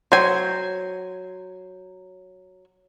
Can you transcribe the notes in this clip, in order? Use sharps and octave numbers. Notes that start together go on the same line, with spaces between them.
F#3 C5 G#5